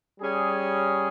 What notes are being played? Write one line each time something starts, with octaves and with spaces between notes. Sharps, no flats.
G3 C#4 G#4